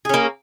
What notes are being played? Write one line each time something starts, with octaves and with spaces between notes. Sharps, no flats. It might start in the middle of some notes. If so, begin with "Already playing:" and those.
A#3 C#4 G#4